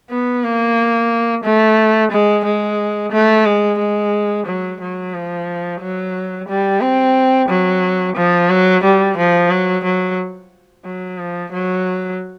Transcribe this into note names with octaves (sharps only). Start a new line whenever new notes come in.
B3
A#3
A3
G#3
G#3
A3
G#3
G#3
F#3
F#3
F3
F#3
G3
C4
F#3
F3
F#3
G3
F3
F#3
F#3
F#3
F3
F#3